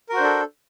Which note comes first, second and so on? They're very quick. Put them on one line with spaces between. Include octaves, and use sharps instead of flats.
A#4 F#4 C5 D4 A4